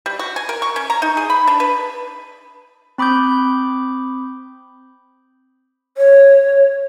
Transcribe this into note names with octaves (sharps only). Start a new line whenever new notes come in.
G3
F#4
G#5
A#4
C#6
C#4
A#5
D#4
G#4
B5
D4
B4
C4 B5 D6 D#6 G6
C#5